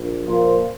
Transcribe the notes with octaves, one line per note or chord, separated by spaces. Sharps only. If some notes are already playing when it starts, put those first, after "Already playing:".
Already playing: A#1
A#2 F3 A#3 F4 C5